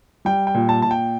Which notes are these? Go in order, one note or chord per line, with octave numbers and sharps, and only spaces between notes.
G3 G5
G5
A#2
A5
A#2 A5
G5